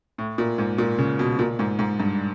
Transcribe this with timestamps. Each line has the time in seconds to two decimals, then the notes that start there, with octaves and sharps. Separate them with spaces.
0.18 A2
0.38 A#2
0.58 G#2
0.78 A#2
0.98 C#3
1.19 B2
1.39 A#2
1.59 G#2
1.79 G#2
2.00 G2